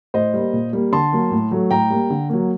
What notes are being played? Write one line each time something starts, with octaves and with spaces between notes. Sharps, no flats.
A2 C5 D#5
G3 A#3
A#2
G3 A#3
D3 A5 C6
F#3 A#3
A2
F#3 A3
A2 G5 A#5
G3 A#3
D3
F#3 A#3